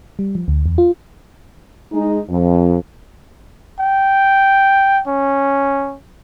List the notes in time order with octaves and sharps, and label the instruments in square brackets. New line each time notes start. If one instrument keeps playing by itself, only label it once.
[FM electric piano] G3
F3
D2
E2
F4
[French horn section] G#3 D#4
F2
[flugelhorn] G5
C#4